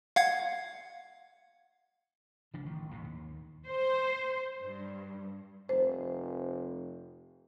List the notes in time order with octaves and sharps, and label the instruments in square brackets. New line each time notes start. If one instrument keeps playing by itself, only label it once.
[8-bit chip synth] F5 F#5 G#6
[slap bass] G#1 C#3 F3 D4
A1 D#3
A1 D#2 G#2 B2
D#2
[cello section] C5
G2
[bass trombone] F1 [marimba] C5